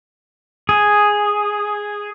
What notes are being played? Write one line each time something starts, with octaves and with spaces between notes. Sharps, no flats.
G#4